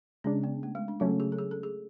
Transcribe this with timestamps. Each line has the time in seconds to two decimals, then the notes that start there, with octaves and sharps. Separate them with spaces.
0.24 C#3 G#3 C#4 D4
0.43 B3
0.63 A3
0.75 G#3
0.88 D4
1.00 C#3 F#3 A3 C#4 F4
1.20 G#4
1.32 A4
1.38 G#4
1.51 A4
1.63 G#4